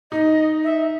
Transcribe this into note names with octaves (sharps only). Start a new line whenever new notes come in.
D#4 D#5
E5